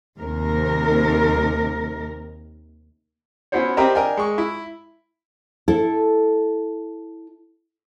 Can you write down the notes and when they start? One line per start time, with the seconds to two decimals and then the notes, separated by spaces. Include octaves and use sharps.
0.19 D#2 C3 A#4
3.52 B3 C#4 E4 F#4 C5 C#5
3.77 C4 G4 A#4 D#5 E5 A#5
3.95 D4 A#4 D#5 G5 G#5
4.17 G#3 C#6
4.38 E4
5.68 E4 A4